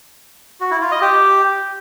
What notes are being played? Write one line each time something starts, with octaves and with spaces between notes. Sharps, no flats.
F#4
E4
F4
D#5
G4